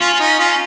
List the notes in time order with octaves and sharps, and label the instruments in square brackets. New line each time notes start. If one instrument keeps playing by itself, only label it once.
[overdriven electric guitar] C#4 [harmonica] F4
[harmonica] F4
D#4
F4